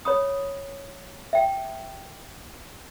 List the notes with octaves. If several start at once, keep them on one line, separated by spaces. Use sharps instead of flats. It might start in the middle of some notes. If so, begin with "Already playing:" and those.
C#5 B5 D#6
E5 G5